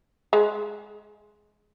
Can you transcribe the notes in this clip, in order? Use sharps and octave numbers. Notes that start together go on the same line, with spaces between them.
G#3